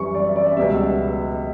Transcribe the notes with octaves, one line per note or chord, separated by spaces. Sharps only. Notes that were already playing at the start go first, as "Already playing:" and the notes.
Already playing: F#2 E3 G3 C#6
D5
E5
D5
E5
C#2 B2 G3 E5